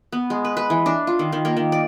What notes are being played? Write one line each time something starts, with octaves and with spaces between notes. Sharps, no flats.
B3
G#3
B4
B4
E3
D4
F4
D#3
D#3
A#3
D#3
D5